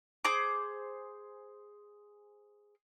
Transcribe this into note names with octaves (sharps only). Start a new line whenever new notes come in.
G#4 C5 D6